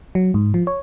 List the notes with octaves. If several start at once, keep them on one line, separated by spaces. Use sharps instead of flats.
F#3
G#2
F3
C#5